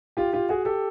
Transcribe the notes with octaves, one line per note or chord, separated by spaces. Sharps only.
F4 G4
F4 G4
F#4 G#4
G4 A4